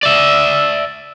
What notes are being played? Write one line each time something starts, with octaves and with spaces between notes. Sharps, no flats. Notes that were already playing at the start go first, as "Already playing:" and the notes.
D5 E5